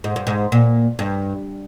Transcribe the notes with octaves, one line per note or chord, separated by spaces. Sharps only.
G#2
G2
G#2
A#2
G2